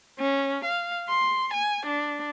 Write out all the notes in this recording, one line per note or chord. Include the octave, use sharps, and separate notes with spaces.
C#4
F5
C6
G#5
D4